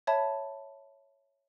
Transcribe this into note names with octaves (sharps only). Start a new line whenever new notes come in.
C#5 E5 A5 B5